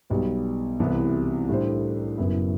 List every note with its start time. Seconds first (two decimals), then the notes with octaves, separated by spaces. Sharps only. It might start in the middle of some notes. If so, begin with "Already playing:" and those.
0.10 B1 B2 G3 B3
0.80 C2 C3 E3 B3
1.49 A2 G3 D4 A4 C5
2.17 F#1 F#2 F#3 B3 E4